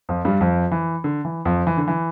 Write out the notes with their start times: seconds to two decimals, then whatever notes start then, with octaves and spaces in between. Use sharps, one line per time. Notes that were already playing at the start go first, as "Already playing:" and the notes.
0.09 F2 F3
0.25 G2 G3
0.41 F2 F3
0.72 E3
1.04 D3
1.25 E3
1.45 F2 F3
1.67 E3
1.77 D3
1.88 E3